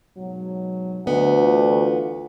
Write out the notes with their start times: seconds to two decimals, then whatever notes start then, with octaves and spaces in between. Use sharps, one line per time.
0.17 G#2 B2 F#3
1.07 D2 D3 B3 D#5
1.40 E3 F4